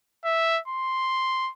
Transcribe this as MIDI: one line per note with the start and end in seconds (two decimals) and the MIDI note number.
0.25 0.59 76
0.68 1.51 84